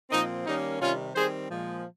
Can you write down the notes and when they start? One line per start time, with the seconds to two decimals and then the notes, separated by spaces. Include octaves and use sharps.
0.10 A#2 F3 C4 D#4
0.45 D#3 G3 A#3 C#4 D#4
0.80 C3 D#3 G3 C#4 F4
1.14 D#3 G3 C4 G#4 C5
1.49 A#2 F3 G#3